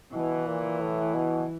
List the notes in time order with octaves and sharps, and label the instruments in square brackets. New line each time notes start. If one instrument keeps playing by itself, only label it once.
[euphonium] B2 [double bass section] E3
[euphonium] A#2
A2
B2